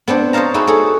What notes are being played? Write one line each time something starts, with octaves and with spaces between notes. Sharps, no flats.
B3 C4 D4 C5
C5 C#5 D#5 F5 A5 A#5
D#4 F#4 G#4 B4 E5
G#4 A4 C#5